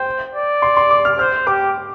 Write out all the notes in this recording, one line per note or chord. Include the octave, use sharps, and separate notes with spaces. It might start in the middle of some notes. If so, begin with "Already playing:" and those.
Already playing: C5 G5
D5
C6
C6
D6
F6
C5 F6
G4 D6